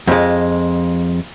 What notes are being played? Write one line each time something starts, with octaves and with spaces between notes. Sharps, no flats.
F2 G#3